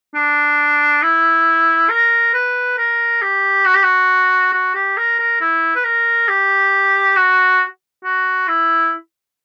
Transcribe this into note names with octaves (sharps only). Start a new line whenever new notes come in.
D4
E4
A#4
B4
A#4
G4
F#4
G4
F#4
F#4
G4
A#4
A#4
E4
B4
A#4
G4
F#4
F#4
E4